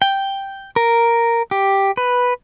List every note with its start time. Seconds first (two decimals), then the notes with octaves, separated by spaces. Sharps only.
0.02 G5
0.76 A#4
1.51 G4
1.97 B4